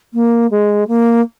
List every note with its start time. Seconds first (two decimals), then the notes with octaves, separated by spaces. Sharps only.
0.14 A#3
0.51 G#3
0.88 A#3